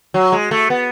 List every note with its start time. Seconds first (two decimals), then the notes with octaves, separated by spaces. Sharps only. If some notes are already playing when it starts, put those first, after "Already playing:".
0.14 F#3
0.32 G#3
0.51 A3
0.70 B3